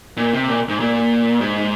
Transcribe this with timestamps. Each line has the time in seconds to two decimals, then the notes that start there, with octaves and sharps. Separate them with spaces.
0.17 A#2
0.33 C3
0.48 A#2
0.69 G#2
0.80 A#2
1.41 G#2